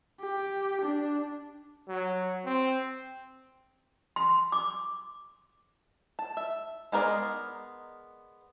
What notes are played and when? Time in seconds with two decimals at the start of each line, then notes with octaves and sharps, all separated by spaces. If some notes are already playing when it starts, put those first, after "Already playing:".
0.21 G4
0.82 D4
1.88 F#3
2.45 C4
4.16 C6
4.52 D6
6.19 A5
6.37 E5
6.92 G#3 B3 A#4 D5 D#5